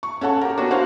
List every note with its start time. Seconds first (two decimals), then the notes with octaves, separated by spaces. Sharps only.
0.03 C#6
0.21 C#4 A4 F#5 A5
0.41 G4 A#4
0.58 B3 D4 F#4
0.71 F#4 A#4 C5 C#5 F5 F#5